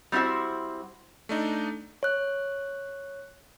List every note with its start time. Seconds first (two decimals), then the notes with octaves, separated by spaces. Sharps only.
0.12 G3 C4 E4 F#4 C5
1.29 A3 D4 D#4
2.03 C#5 F#6